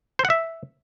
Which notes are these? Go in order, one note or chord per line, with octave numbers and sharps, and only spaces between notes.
C5
F#5
E5